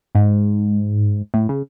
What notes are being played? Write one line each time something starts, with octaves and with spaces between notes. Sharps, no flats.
G#2
A2
C#3